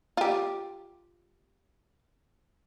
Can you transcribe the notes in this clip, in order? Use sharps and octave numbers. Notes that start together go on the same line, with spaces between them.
F4 G4